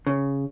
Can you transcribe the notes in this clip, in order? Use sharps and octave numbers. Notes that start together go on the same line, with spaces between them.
C#3